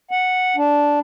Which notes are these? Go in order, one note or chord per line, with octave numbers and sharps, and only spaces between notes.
F#5
D4